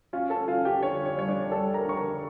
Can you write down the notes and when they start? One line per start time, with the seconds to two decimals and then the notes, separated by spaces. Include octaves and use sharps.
0.13 C#4 F4 F5
0.30 A4 A5
0.48 C#4 F4 F5
0.65 G4 G5
0.82 D3 C#5
1.06 C#5
1.17 G3 C#5
1.28 D4 D5
1.52 G3 A4 A5
1.74 A#4 A#5
1.86 D3 C#6
1.97 A#4 A#5